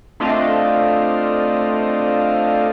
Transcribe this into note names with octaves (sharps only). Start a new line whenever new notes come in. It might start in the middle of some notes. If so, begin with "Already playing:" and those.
A3 C4 D4 F4 D#5 F5